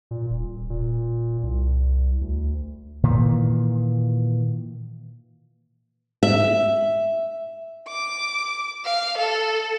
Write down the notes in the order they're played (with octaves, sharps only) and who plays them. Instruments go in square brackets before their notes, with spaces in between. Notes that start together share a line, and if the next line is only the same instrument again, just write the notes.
[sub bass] A#2
D#1
A#2
C2
D2
[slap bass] A#2 D#3 E3
[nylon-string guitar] E5
[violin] D6
F5
A4